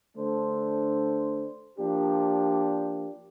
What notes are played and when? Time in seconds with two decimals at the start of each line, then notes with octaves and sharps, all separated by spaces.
0.17 D3 A3 D4 A4 C5
1.79 F3 A#3 D4 G4